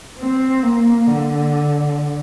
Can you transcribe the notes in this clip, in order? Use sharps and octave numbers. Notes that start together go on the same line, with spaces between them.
C4
A#3
D3